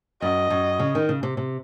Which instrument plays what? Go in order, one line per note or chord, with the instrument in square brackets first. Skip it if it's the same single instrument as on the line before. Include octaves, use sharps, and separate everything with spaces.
[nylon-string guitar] F#2 [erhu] D#5
[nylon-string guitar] F#2
C#3
D#3
C#3
C3
C3